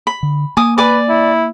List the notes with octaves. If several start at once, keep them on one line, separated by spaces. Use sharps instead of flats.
B5
D3
A#3 G#5 D6 D#6
B4 D5 G#5 D6
E4